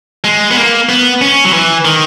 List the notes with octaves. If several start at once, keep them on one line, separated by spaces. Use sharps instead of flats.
G#3
B3
A#3
B3
C#4
F#3
E3
D#3